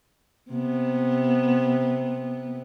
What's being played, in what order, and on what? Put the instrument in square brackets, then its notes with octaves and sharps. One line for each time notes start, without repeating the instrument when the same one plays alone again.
[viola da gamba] C3 B3